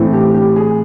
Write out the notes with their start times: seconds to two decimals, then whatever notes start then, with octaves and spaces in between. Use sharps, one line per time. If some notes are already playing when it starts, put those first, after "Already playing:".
Already playing: A2 E3 A3 C4
0.13 G4
0.34 G4
0.56 G#4